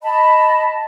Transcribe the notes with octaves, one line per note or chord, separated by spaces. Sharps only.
D#5 A5 B5